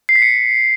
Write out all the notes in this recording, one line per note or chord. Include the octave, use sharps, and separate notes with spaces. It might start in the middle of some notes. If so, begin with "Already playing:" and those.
C7
B6
C#7